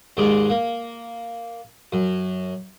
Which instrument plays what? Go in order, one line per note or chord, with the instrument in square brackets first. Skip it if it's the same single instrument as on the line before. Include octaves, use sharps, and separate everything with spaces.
[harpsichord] D#2 G#2 G#3 D6
A#3
F#2